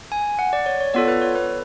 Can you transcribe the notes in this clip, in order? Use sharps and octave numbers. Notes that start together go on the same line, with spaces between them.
G#5
F#5
D5
C#5
C#5
B3 F4 A4 D5
B4
C#5
B4